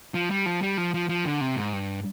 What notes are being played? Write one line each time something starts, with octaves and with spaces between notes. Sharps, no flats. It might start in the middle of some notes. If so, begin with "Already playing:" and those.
F3
G3
F3
G3
F3
F3
F3
D3
C3
G#2
G2